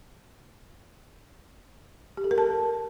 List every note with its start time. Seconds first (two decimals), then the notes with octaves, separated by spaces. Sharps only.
2.17 G4
2.24 A4
2.31 A#4
2.38 A5